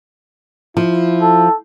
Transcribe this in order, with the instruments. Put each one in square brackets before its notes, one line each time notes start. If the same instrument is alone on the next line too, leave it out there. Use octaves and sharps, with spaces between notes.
[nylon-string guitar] F3 [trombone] E4
[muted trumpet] A4